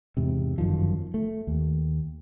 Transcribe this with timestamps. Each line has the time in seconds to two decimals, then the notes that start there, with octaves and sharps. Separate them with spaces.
0.17 E2 G#2 C3
0.58 G1 F#2 D#3 F3
1.14 A3
1.47 D#2